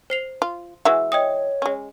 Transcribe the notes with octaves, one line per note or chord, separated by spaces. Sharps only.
C5 C7 F7
F4
E3 G#3 F#4 E5 E6
C#5 D#5 G5 D#6
G#3 C#4